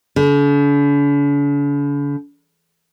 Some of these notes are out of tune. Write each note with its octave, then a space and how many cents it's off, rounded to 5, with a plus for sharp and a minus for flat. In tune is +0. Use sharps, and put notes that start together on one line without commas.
D3 -45